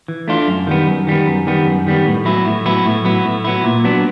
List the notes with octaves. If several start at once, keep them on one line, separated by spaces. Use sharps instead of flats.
E3
A3 D4 F4
F#2
D#3 G3 B3
F#2
D#3 G3 B3
F#2
D#3 G3 B3
F#2
D#3 G3 B3
A2
F#3 B3 E4
A2
F#3 B3 E4
A2
F#3 B3 E4
A2
F#3 B3 E4
A#2
F#3 B3 D4